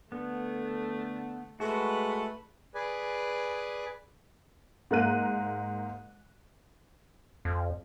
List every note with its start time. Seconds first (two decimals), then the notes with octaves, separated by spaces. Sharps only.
0.12 D3 A3 B3
1.60 G#3 A3 F#4 B4
2.75 G#4 B4 D5 G#5
4.91 G#2 A#3 A#4 F5 F#6 D#7
7.45 F2